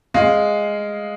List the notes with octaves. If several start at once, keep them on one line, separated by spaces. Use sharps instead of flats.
G#3 F5